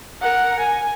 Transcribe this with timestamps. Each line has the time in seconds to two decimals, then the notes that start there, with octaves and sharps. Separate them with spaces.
0.21 A#4 F#5
0.60 G#5